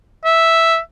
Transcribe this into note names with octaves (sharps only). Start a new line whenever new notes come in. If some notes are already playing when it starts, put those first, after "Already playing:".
E5